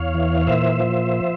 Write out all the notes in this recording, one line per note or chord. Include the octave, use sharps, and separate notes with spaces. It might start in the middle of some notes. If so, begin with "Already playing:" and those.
Already playing: E2 C#5 F5
E3
C#5
A#2 C5 E5
F3